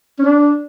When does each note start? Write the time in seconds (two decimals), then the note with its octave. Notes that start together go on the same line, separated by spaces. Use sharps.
0.19 C#4
0.25 D4